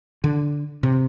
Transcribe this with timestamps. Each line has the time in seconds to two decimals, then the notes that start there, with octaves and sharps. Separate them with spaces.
0.24 D3
0.83 C3